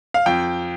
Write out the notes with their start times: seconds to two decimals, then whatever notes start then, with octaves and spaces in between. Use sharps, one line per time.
0.14 F5
0.26 F2 G5